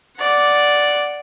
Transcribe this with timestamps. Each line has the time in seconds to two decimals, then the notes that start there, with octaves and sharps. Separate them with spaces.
0.17 D5 F#5